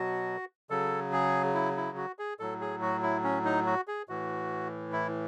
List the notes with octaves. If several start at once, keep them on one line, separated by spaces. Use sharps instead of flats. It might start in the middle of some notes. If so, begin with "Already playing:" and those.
Already playing: B2 F#3 F#4
C#3 F#3 A4
G#4
E4
E4
F#4
G#4
A2 F#3 A4
G#4
F#4
E4
C#4
D#4
F#4
G#4
A2 E3 F#4
E4